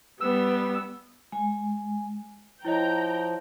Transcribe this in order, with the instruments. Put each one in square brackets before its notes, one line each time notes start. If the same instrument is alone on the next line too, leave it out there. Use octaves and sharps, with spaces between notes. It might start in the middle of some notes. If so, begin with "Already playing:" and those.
[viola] G3 B3 [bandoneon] E6
[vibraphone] G#3 G#5
[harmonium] F3 [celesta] E4 C#5 D#5 [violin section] G5 A#5 G6